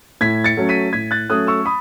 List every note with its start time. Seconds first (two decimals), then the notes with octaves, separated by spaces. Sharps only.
0.21 A2 G#6 B6
0.44 A6 C#7
0.57 F#3 A3 C#4
0.69 B6 D#7
0.93 A2 G#6 B6
1.11 F#6 A6
1.30 F#3 A3 C#4 D#6 F#6
1.47 C#6 E6
1.66 B5 D#6